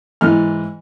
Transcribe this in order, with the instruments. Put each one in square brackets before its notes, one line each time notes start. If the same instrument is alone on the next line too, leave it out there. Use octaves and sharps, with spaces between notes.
[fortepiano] G#2 E3 F6